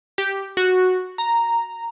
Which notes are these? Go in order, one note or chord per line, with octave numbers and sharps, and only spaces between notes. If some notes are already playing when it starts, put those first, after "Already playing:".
G4
F#4
A#5